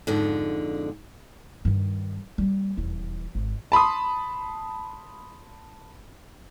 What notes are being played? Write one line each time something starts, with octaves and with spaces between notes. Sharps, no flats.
F2 G#2 D3
G2 D#3
G3 A#3
D#1 E2
G#1
A5 B5 C6 D#6